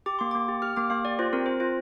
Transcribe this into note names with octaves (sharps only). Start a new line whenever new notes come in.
G4 D6
A#3 C6
A#3 D6
G4
G4 F6
A#3 D6
A#3 F5
G4 D5
F4 C5
C4 A#4
C4 C5
F4 C5